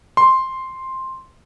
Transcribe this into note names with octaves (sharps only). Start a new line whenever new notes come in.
C6